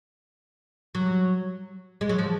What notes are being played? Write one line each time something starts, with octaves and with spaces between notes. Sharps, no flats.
F#3
G#3
F#3
F3